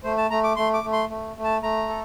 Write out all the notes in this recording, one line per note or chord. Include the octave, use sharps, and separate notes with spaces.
A3 C5
A5
A3 A#5
D6
A3 C6
D6
A3
C6
A3
A3
A5
A3 A#5
A4